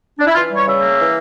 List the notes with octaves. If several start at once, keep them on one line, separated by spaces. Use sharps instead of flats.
D4
E4
E3 F4
G3
C#5
C#3 E5
A#3
E3